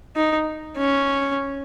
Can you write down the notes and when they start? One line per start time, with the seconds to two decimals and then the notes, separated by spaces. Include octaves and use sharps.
0.16 D#4
0.78 C#4